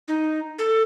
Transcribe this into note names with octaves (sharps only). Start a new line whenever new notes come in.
D#4
A4